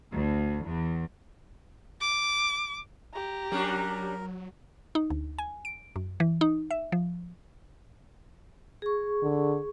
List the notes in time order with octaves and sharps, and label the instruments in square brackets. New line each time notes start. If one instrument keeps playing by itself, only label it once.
[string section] D2
E2
[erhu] D6
[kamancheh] G4 A#5
[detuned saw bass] F#3 [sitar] G3 C#4 D4 [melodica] A#4
[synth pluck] D#4
D2
G#5
D7
F#2
E3
D#4
E5
F3
[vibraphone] G#4 C#6
[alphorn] D3